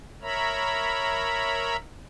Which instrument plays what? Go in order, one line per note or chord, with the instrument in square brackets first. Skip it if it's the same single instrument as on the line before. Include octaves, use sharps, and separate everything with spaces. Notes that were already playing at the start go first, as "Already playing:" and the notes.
[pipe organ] A#4 C#5 E5 A#5 B5